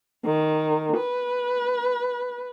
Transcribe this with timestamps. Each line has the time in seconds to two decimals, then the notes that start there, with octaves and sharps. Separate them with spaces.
0.25 D#3
0.97 B4